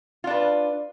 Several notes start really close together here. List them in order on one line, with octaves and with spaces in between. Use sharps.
F4 D4 B4